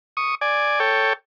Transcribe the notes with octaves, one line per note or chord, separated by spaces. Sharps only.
C#6 D#6
D5 G#5
A4 C#5 G5